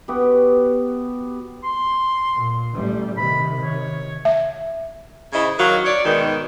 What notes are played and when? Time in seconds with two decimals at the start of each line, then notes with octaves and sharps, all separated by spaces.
0.08 B3 F#4 G4
1.64 C6
2.35 A#2
2.74 A1 G3
3.17 C3 D#3 B5
3.62 C#5
4.25 E5
5.33 C#3 E4 C5 D#5
5.58 D#3 F#3 F#4 F5
5.85 C#5 D5
6.05 G#2 B2 D#3